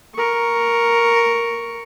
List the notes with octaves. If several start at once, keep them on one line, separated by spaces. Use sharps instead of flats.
A#4 C#6